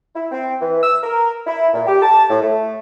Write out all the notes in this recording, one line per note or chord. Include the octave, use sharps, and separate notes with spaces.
E4
C4
E3
E6
A#4
E4
A#2
G4
A5
A2
A3